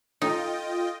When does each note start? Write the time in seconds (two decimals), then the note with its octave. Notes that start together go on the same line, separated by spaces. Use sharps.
0.22 D#4 F4 A4 D#5 G5